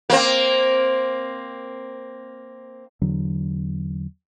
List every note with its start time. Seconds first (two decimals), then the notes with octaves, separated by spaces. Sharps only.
0.10 A#3 C4
3.02 E2 D3 F#3